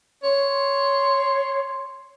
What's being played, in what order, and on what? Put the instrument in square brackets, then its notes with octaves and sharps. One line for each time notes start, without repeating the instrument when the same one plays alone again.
[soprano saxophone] C#5 [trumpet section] C6